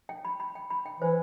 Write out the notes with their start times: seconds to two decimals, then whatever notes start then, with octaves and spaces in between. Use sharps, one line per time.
0.09 G5
0.25 B5
0.40 B5
0.55 G5
0.70 B5
0.86 G5
1.01 E3 C5